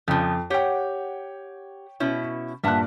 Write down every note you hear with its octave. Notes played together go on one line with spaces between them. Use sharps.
F2 C#3 F3
G4 C#5 F#5 G5
B2 C#4 E4
G2 A#2 E5 F#5 A5 F#6